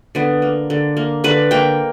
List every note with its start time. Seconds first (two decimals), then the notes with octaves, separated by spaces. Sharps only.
0.15 D3 B3
0.42 A#3
0.70 D3
0.97 A#3
1.24 D3 B4
1.51 A#3 G5